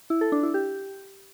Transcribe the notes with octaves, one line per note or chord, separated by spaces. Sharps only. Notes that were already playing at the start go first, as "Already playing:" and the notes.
E4
A4
D4
E4
G4